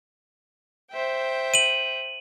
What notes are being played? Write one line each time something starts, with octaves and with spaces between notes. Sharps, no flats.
C5 E5 G5
D#7 F#7